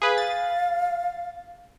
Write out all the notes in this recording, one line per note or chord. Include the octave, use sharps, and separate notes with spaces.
G#4 B4 F5
A6